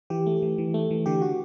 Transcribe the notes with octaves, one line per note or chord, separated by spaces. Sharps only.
E3 G4
A3
E3
E3
A3
E3
D3 G4
F#4